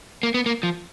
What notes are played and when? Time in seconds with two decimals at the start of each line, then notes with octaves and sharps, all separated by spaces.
0.23 A#3
0.34 B3
0.46 A#3
0.63 F3